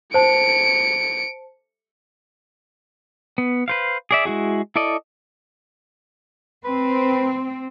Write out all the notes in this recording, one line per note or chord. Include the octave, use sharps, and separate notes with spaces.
C5 A5 C#7 D7
B3
B4 C5 F5
G#4 D5 E5
G#3 E4 F#4 G#4
E4 A4 D5 D#5
C4 B4